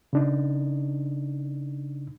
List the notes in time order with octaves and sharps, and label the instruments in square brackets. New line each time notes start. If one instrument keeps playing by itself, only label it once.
[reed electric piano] C#3 D4 D#4